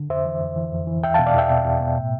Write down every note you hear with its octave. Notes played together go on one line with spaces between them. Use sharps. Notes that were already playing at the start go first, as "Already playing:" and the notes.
Already playing: D3
F2 C5 E5
E3
F2
E3
F2
E3
E2 E5 G5
B2 F5 A5
D5 F5
E2 E5 G5
B2
E2
B2
A2